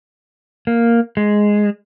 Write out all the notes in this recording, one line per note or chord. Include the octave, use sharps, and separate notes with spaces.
A#3
G#3